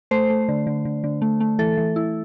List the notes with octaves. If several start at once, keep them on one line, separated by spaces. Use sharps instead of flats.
A3 C5
A3
D3
D3
D3
D3
A3
A3
E3 A4
E3
E4